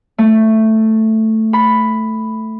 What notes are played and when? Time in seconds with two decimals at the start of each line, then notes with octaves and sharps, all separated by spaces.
0.18 A3
1.53 B5